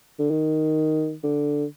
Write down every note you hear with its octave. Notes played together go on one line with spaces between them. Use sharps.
D3
D#3
D3